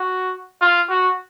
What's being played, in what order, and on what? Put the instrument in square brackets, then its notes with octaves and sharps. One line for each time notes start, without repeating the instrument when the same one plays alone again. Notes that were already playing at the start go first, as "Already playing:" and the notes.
Already playing: [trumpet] F#4
F4
F#4